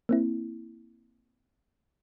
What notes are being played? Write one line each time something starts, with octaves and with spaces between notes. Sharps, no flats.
A#3 C4 E4